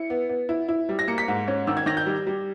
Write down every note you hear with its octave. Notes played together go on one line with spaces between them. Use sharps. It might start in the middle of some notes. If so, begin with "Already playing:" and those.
Already playing: E4 C#7
B3
B3
E4
E4
G3
A#6
A#3 C#7
B6
G#2
C#4
D#3 E6
G#6
D#3 A#6
G6
G3
G3